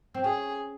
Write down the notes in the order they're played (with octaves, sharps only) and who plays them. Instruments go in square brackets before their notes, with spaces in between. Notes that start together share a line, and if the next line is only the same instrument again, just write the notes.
[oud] C4
[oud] C#4 [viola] G#4